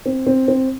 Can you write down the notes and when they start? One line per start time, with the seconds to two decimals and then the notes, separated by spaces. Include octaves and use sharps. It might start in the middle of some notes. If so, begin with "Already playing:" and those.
0.06 C4
0.27 C4
0.48 C4